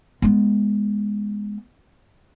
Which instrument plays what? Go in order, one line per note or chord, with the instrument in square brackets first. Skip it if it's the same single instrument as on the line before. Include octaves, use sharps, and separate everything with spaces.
[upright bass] G#3 B3